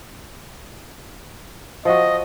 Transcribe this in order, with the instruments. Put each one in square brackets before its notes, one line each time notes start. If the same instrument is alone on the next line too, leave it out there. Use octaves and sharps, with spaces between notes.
[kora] F3 F#4 [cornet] D#5